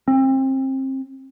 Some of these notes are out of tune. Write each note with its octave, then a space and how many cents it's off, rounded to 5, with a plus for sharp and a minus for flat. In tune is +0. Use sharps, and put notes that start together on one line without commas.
C4 +30